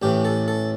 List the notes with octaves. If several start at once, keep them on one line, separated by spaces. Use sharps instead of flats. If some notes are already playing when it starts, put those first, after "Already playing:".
A1 A2 E3 G4
A4
A4